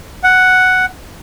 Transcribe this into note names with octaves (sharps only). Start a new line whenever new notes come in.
F#5